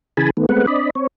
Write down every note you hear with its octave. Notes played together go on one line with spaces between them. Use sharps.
C#3 E3 G#4 G#5 A5 B5
D#3 A3 B3
G#3 A3 B3 C4 B4 F#5
C4 D4 D5 D#5 B5
C4 C#5